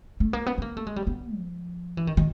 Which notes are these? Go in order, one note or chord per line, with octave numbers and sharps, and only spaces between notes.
A3
A#3
B3
B3
A#3
A3
G#3
G3
B3
F3
E3
D#3
D#3